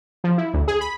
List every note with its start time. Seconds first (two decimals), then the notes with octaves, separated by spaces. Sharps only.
0.24 F3
0.38 E4
0.54 D2
0.68 G#4
0.81 B5